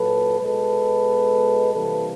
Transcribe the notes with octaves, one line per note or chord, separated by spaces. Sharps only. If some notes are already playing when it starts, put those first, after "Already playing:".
Already playing: A#2 F#3 A#3 A4 B4
B2 G#3 B3 A4 B4
C3 E3 G3 A#3 A4 B4